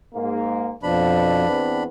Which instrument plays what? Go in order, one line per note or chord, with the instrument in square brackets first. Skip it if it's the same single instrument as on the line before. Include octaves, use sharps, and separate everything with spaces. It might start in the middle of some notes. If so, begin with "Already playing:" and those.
[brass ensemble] G#2 A#3
[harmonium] F2 F3 [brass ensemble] B2 [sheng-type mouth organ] D4 B5
[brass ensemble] E2 B3 C4